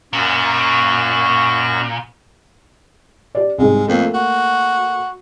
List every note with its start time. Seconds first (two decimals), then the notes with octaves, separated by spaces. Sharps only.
0.13 F#2 A#2 F#4 C#6
3.35 G4 D5
3.58 C2 G#2 G#3
3.88 F2 A3 A#3
4.14 F#4